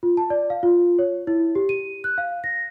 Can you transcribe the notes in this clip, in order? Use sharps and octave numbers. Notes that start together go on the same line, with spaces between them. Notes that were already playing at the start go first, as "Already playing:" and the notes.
F4
A5
D5
F5
F4
C#5
E4
G4
D#7
F#6
F5
A#6